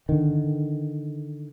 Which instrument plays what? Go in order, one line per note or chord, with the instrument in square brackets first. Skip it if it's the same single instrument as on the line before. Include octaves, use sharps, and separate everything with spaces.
[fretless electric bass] D3 D#3